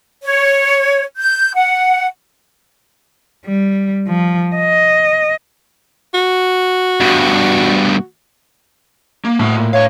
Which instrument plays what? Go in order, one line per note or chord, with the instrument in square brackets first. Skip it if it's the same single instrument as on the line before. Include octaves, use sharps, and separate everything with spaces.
[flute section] C#5
G6
F#5
[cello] G3
F3
D#5
[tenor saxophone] F#4
[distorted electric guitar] G2 B2
[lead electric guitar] A#3
[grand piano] A2 [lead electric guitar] F#4 A5
[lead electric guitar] A#2
[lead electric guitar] B4 F5 [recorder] C#5